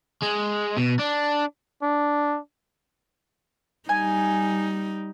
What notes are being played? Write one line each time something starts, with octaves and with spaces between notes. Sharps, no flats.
G#3
B2
D4
D4
G3 D#4 G#5